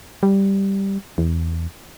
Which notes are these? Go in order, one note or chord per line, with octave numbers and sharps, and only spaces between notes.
G3
E2